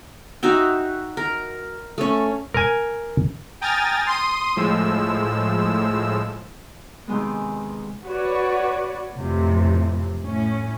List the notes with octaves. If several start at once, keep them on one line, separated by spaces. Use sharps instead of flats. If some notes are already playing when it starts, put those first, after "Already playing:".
D#4 F#4 E5 G5
A#4
A3 C#4
A#4 G#5
G5 G#5 A#5 D#6 F6 A6
C6 D#6 D#7
A2 F3 G#3 E6
C3 D#3 G#3 B3
F#4 B4 C#5 D5
F2 A2 C3 E3 F3
A2 C#4